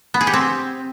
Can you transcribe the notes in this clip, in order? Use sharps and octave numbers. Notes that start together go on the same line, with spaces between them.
B3
G#4
G4
C4